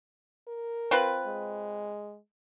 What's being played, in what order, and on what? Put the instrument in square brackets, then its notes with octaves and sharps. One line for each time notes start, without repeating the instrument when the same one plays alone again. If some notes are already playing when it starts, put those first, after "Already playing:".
[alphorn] A#4
[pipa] C4 F4 B4
[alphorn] G#3